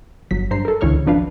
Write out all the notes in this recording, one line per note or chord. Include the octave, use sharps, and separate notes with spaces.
G1 F#3 B6
G2 C5 A#5 C7
A4 A#4
C#2 D3 E3 C#5 C#6 F6
G#1 F3 D4 B4 F5